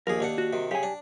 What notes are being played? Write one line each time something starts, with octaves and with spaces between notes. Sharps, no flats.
A#1 D#2 G#4 A#4
D#2 D4 F#5
F#4
C3 D#3
C#3 G4 G#5
D4